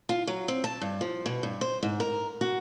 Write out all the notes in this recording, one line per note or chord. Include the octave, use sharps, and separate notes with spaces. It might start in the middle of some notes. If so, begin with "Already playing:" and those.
F4
F#3
C4
A5
G2
F3
B2
G2
C5
G#2
A#4
F#4